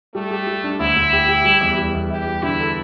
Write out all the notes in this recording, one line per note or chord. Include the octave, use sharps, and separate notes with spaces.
G3 A3
G4
G3
D4
D2 E4
D2
G4
G4
G3
E2
G3
E2
E4 G4
G3
D3 E4
A4